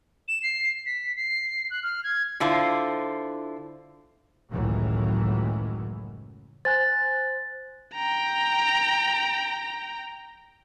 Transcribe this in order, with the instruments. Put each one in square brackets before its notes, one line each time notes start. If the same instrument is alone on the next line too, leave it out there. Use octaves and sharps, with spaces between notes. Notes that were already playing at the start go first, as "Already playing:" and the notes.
[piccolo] E7
C7
B6
C7
F#6
F6
G#6
[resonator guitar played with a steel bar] D3 E4 F4 C5
[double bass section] F#1 C#2 A2 D#3 E3 F#3
[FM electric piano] C5 G#5 F#6 [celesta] A6
[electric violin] G5 A#5